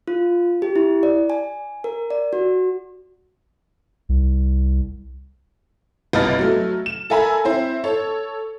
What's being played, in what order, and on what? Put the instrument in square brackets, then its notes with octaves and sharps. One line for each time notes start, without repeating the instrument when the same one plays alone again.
[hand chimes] F4
G4
E4
D5
G#5
A#4
D5
F#4
[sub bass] C2
[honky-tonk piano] G1 C2 B4 D#5 F6 A6
F#3 A3
E7
A4 A#4 E5 G#5 A#5 B5
C4 E4 C5
A4 C#5